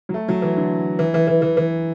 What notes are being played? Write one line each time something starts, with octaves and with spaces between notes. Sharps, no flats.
F#3
A3
F#3
E3
D3
E3
E3
E3
E3
E3